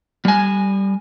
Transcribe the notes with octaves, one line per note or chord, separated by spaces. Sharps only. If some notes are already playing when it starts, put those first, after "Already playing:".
G3 G#5